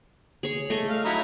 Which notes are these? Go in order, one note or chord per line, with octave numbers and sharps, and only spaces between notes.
G#4 C#5
A3 D#5 G#5
F5
F#3 D#4 E4